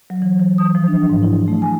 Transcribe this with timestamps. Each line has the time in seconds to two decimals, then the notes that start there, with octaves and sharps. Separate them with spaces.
0.10 F#3
0.22 E3
0.40 E3
0.58 D#6
0.75 F3
0.88 D4
1.09 G#2
1.23 E4
1.48 A3
1.62 G#5